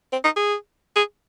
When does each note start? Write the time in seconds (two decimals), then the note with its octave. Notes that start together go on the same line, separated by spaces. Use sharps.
0.13 C4
0.24 D#4
0.36 G#4
0.96 G#4